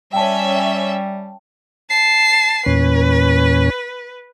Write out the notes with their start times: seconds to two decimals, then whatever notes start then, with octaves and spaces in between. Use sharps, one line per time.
0.13 G3 C#4 E5 G5 A5
1.90 A5 C7
2.66 E2 A#2 C#4 B4